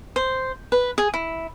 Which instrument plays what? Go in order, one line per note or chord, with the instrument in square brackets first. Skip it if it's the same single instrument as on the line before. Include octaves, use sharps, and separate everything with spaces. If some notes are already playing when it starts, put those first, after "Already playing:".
[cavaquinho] C5
B4
G#4
E4